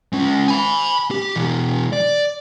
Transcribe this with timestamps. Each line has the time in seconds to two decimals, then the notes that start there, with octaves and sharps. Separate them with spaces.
0.13 G#3 C#4
0.48 G#5 B5
1.11 G4
1.36 B2 E3
1.93 D5